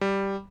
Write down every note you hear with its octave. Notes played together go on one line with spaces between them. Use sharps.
G3